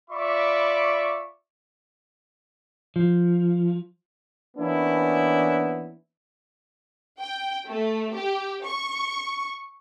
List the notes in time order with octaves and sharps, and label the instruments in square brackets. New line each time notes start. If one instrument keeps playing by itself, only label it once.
[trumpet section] F4 D5 E5 B5 C#6 D6
[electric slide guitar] F3
[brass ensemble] E3 A#3 B3 C#4 D4 E4
[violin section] G5
A3
G4
C#6